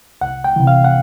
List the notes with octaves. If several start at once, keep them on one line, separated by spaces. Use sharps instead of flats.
C2 F#5
G5
C3 E3
F5
F#5